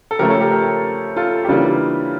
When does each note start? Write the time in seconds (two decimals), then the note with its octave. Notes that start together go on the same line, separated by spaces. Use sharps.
0.11 A4
0.19 C#3 F3 A3 G4 A#4
0.30 A4 C#5
0.41 G4 A#4
0.51 G4 A#4
1.16 F4 A4
1.44 G4
1.48 C#3 E3 G3 A#3 D4 F4